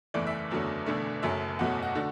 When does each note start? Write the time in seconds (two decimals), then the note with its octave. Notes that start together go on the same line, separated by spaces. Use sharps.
0.14 F#1 E2 E3 A3 D5
0.27 E5
0.51 F#1 E2 D3 F#3 A3
0.86 E1 E2 D3 A3
1.22 F#1 F#2 F#3 A3 E5
1.59 F#1 E2 B2 F#3 A3 F#5
1.82 F#4
1.95 D3 A3